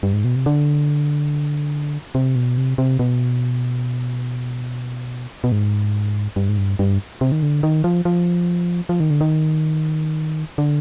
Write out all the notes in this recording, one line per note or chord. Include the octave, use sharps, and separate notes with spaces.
G2
G#2
B2
C3
D3
C3
B2
C3
C3
B2
B2
G#2
G2
G#2
G2
G2
C3
D#3
D3
D#3
F3
F3
F3
D#3
D3
D#3
D3